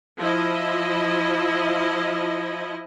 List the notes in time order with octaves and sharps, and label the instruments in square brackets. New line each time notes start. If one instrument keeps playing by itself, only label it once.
[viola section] F3 E4 D#5